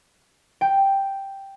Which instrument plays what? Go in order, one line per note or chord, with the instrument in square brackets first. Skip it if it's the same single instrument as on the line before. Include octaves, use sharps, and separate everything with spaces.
[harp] G5